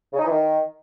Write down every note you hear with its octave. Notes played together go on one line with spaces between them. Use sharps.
C#3
D#4
E3
D#3